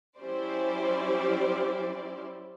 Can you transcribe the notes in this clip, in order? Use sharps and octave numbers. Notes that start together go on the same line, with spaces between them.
F#3 C#4 E4 G4 C5 D5